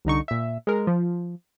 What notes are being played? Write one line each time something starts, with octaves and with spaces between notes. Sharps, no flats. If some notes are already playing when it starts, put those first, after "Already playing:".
C2 D3 D#4 C#6
A#2 E5
G#3 A#4
F3